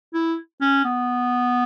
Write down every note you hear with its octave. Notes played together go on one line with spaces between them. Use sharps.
E4
C#4
B3